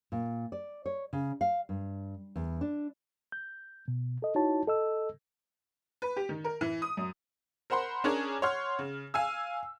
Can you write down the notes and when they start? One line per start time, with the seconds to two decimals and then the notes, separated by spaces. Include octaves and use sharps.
0.12 A#2
0.52 D5
0.86 C#5
1.13 C#3
1.41 F5
1.69 G2
2.36 E2
2.61 D4
3.32 G6
3.88 B2
4.22 A4 D#5
4.35 D#4 E4 F#4 C#5 A5
4.67 A4 D#5 E6
6.02 B4
6.16 G4
6.29 D#3
6.44 A#4
6.61 E3
6.82 D#6
6.97 F#2
7.70 A#4 C5 F#5 B5 C6
8.04 C#4 D4 G#4 A#4 C#5 D5
8.42 C#5 F#5 C6 F6
8.79 C#3
9.14 F5 G#5 E6